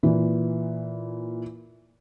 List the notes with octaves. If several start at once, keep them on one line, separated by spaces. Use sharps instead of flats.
A#2 E3